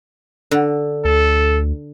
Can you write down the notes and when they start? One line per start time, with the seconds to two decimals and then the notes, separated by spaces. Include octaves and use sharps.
0.51 D3
1.05 D2 A4